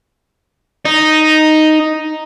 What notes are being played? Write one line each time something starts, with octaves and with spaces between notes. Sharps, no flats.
D#4